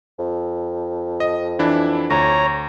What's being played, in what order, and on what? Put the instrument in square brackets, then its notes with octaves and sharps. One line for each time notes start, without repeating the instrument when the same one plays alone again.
[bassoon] F2
[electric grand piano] D#5
E3 D4 E4
[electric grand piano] D2 [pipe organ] C#5 A#5